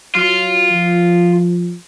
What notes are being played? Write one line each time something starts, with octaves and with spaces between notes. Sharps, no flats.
F#3 F4
F3